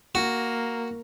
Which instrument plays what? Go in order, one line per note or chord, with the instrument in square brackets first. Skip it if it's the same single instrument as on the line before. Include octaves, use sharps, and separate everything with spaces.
[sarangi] A#3 [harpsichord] F#4